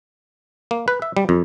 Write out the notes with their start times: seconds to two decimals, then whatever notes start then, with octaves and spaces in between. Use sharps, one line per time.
0.71 A#3
0.88 B4
1.02 E5
1.17 G3
1.29 F2